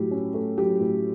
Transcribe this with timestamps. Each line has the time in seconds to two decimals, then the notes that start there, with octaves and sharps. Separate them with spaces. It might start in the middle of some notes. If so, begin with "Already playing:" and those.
Already playing: A2 F#3 G4
0.11 C#4
0.34 A3
0.58 F#3 G4
0.80 A2